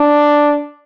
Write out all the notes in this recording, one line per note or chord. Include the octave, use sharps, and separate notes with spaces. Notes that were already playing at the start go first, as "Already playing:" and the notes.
Already playing: D4